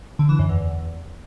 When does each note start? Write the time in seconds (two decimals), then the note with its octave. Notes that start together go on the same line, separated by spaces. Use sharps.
0.19 D3
0.29 E3
0.39 F#2
0.49 E2